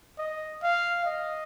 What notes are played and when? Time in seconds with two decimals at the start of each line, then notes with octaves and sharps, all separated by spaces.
0.18 D#5
0.63 F5
1.05 D#5